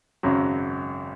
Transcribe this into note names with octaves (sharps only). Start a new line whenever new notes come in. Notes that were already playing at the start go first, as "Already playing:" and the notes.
G#1 F#2 C#3 F#3